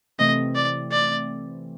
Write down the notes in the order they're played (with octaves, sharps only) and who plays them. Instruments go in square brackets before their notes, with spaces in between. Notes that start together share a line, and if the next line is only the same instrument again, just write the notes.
[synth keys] C3 E3 A3 C4 [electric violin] D#5
[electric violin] D5
D5